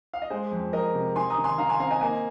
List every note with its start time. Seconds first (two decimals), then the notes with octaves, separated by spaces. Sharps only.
0.13 F5
0.22 D#5
0.30 G#3 G#4 C5
0.52 F2
0.73 F2 A#4 D#5
0.94 C3
1.15 D#4 G#5 C6
1.30 A#5 D#6
1.37 D#3
1.44 G#5 C6
1.58 D#3 F5 A#5
1.69 G#5 C6
1.80 C4 F5 A#5
1.91 D#5 G#5
2.01 A#3 D#5 G#5